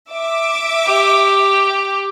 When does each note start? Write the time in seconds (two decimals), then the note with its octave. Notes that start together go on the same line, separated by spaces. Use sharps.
0.11 E5 D6
0.87 G4